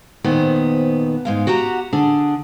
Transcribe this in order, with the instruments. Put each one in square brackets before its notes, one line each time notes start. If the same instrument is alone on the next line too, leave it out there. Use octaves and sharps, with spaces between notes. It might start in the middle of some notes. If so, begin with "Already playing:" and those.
[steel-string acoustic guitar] F2 A#2 D#3 B3 C5
G#2 G#3 F5
F#4 G4 F#5 A#5
D3 D4 G#4